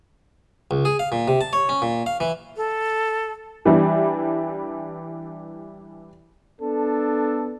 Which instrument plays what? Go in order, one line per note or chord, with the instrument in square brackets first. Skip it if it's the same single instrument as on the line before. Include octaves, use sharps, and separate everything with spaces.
[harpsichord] C#2
G#4
F5
A#2
C3
A5
C#5
C#4
A#2
F5
E3
[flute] A4
[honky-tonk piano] E3 G3 D4 E4 G4
[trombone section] B3 D4 A4